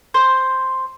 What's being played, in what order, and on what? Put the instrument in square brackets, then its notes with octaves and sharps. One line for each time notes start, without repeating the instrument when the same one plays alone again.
[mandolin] C5